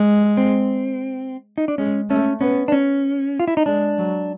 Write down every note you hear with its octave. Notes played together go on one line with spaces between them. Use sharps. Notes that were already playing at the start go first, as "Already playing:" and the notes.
Already playing: G#3
C4
D#4
D4
G#3 C#4
A3 C#4
B3 C#4
D4
C#4
F4
E4
D#4
G#3 D4
F#3